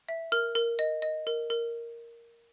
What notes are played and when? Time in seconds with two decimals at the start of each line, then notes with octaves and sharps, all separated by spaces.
0.09 E5
0.32 A#4 F6
0.55 A#4
0.79 D#5
1.02 D#5
1.27 A#4
1.50 A#4